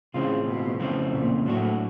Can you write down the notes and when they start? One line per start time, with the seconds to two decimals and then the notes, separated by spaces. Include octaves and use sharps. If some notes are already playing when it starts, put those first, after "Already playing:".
0.14 A2 C#3 E3 G#3 C4 F4
0.47 B2
0.80 F2 C#3 E3 A3 C4
1.13 A#2
1.45 A2 F#3 A3 D4 F#4